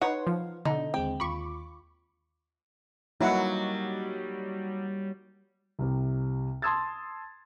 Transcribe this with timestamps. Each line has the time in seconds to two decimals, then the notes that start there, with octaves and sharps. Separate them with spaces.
0.01 D#4 B4 C#5 F#5 C6
0.27 F3 F5
0.65 B2 D3 D#4
0.94 D#2 G#3 C4 G5
1.20 D#2 F4 B5 C#6 D6
3.20 F#3 G3 A#3 D#4 E4 F#4 F#5
5.79 C2 C3
6.62 A5 C6 D#6 E6 G#6 A6